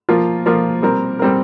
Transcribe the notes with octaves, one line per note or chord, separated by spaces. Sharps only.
F3 A#3 F4
F3 A#3 F4
G3 C4 A#4
G3 C4 A#4